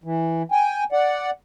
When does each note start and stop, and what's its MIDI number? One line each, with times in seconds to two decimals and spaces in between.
0.04 0.42 52
0.52 0.84 79
0.52 0.84 80
0.92 1.30 74
0.92 1.30 78